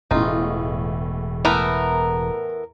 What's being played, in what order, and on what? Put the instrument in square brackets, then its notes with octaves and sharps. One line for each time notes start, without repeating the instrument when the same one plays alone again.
[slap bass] E1 [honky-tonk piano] E2 A2 [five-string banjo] D#4 F4
[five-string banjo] E3 A3 B3 [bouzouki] A#4